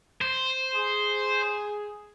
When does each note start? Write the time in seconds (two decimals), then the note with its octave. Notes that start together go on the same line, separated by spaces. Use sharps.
0.21 C5
0.74 G#4